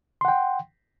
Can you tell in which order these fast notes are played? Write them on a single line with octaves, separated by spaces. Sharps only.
C6 F#5 G5